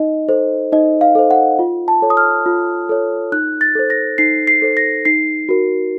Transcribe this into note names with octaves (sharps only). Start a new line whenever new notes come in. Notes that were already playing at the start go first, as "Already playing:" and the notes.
Already playing: D#4 D#5
A4 C5
D#4 D#5
F5
A4 C5
F#5
F4
A5
A4 C#5
D#6
F6
F4
A4 C#5
D#4 F#6
A6
A4 C5
A#6
D#4 C7
C7
A4 C5
A#6
D#4 C7
F#4 A#4